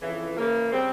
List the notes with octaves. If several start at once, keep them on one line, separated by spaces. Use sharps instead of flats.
F2 C#3 E3
C#3 E3 A#3
C#3 G3 C4